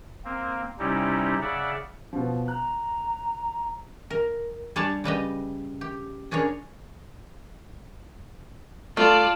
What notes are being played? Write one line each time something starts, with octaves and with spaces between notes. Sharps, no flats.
A#3 C4
C3 G3 C#4 D#4 E4 G4
C#3 D5 E5 F#5
B2 F3
A#5 F#6
A#4
G3 D4 C#5 D5 G#5 A5
C#3 G3 B4 D#5
G4
C#4 D4 G#4 A#4 C#5
A3 F4 D5 A5